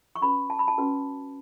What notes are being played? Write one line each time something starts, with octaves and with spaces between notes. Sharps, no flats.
C#6
C#4 F#4 B4 B5
A5
B5
A5
C#4 F#4 B4